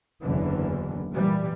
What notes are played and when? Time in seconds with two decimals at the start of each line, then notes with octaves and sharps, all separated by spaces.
0.23 F#1 E2 D3 E3
1.11 A#2 E3 G3